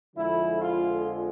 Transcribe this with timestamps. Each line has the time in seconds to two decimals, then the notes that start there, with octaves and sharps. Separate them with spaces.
0.15 F2 D3 F3 G#3 E4
0.61 F4